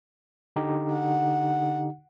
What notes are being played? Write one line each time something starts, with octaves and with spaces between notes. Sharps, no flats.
D3 D#4 G4
F#5